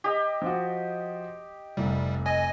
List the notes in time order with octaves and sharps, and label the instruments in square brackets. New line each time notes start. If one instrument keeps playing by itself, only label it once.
[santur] G4 D#5
[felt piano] F3 F#4
[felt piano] F1 C2 [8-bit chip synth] G3
[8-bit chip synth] D#5 G#5